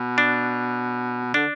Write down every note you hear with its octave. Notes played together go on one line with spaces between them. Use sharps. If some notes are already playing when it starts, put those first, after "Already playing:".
Already playing: B2
D4
D3 D4